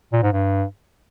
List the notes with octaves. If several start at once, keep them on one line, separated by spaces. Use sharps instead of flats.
A#2
G#2
G2